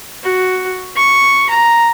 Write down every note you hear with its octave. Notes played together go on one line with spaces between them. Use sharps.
F#4
C#6
A#5